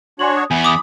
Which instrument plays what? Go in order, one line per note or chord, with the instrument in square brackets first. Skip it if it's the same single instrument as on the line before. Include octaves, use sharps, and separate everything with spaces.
[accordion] D4 F#4 C#5 [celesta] G#5 C6 F#7
[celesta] D#6
[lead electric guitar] E2 [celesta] G#5 [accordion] B5
[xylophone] D6 D#6